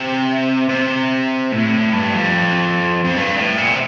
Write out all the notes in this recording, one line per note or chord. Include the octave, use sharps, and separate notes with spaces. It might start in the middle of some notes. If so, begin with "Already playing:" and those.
Already playing: C3
C3
A2
G2
F2
F2
G2
A2
A#2
C3